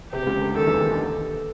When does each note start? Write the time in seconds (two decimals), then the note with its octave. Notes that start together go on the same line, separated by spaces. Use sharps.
0.12 C3 G4
0.22 C3
0.27 C#2 C#3
0.42 D2 D3
0.56 D#2 D#3 A4
0.67 E2 E3
0.78 D#2 D#3
0.89 D3